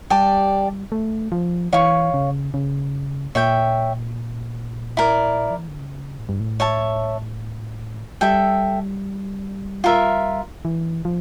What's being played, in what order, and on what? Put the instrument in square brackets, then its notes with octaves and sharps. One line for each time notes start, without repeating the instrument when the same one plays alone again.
[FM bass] G3 [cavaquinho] G4 D5 A5
[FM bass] A3
F3
[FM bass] E3 [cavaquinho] C#5 F5 C#6
[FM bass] C#3
C#3
[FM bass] A#2 [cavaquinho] C#5 E5 G5
[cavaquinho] E4 A#4 D5
[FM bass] F3
E3
D3
C#3
A2
G2
A2
[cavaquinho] C#5 E5 A5
[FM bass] G3 [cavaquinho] A4 E5 G5
[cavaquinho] F4 A#4 E5
[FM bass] E3
F3